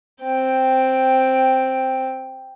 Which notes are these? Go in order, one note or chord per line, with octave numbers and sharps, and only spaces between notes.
C4 G5